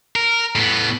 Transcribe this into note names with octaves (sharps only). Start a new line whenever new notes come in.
A#4
A2 B3